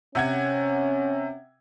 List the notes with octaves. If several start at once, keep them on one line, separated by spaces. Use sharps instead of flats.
C3 C#4 F#5 G#6